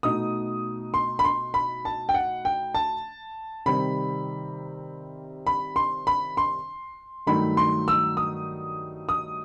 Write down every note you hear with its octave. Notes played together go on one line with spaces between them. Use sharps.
B2 A3 D#4 D#6
C6
B5
C6
B5
A5
G5
F#5
G5
A5
C3 D#3 G3 C4 B5
B5
C6
B5
C6
G2 D#3 F#3 A3 D#4 B5
C6
E6
D#6
D#6